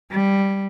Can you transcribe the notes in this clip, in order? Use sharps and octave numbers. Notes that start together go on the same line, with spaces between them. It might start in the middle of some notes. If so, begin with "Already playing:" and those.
G3